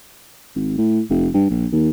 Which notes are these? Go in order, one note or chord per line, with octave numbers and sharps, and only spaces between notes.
G#1
A2
F1
G2
A#1
D#2